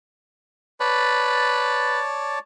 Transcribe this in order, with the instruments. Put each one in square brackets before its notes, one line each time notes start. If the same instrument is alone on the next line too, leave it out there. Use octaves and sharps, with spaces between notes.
[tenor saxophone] B4 [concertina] C#5 D5 A5